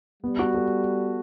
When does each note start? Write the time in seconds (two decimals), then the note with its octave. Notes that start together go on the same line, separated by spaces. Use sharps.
0.23 G3 B3
0.39 F#4
0.54 A4